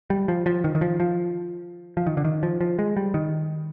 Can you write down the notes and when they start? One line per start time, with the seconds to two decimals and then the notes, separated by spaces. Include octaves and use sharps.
0.10 G3
0.28 F3
0.46 F3
0.64 D#3
0.75 D#3
0.81 F3
1.00 F3
1.97 F3
2.07 D#3
2.17 D3
2.24 D#3
2.43 F3
2.61 F3
2.79 G#3
2.97 G3
3.14 D#3